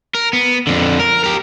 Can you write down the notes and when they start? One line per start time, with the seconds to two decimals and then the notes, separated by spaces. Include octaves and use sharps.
0.15 A#4
0.33 B3
0.67 F2 D3
0.99 A#4
1.24 G4 A#4